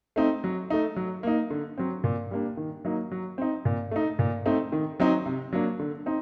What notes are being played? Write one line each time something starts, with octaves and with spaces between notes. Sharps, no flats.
A3 C4 D#4
F#3
A3 D#4
F#3
A#3 D#4
D3
F#3 C4
A#2
G3 A#3 D4
D#3
F#3 A#3 D#4
F#3
C4 D#4
A#2
A3 D#4
A#2
A3 C4 D#4
D#3
F#3 C4 D#4
C3
F#3 A#3 D4
D3
C4 D#4